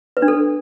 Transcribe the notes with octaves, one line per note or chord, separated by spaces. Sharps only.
B4
D4
A4